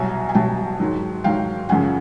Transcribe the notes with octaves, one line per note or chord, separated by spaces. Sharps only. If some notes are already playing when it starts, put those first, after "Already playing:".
Already playing: C2 B2 F#3 G#5 A#5
G#5
C2 B2 F#3 G5 A5
G#2 D#3 F#3
G#2 D#3 F#3 F5 G5
F#2 C#3 F3 F#5 G#5